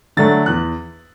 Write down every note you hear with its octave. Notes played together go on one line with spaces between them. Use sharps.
D3 F#3 A3 D4 A6
E2 F#6